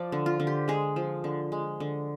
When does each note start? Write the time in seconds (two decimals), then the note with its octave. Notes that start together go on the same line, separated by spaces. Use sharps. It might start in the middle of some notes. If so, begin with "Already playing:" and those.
Already playing: F3 D5
0.12 D3
0.26 F4
0.40 D3
0.47 G4
0.68 G#3 G#4
0.96 F3
1.24 D3
1.52 G#3
1.80 D3